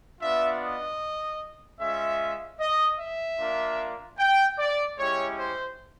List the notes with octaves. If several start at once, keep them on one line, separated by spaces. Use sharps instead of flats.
B3 D4 F4 E5
D#5
G#3 C#4 F4 E5
D#5
E5
A#3 D4 F4
G5
D5
G#3 C#4 E4 G4 C#5
C5